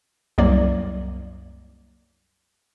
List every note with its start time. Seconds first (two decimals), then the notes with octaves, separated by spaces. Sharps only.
0.38 C2 F#2 F#3 A#3 D5